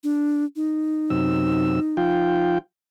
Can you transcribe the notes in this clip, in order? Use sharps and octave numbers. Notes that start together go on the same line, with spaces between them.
D4
D#4
F#2 C3 E6
F3 F4 G5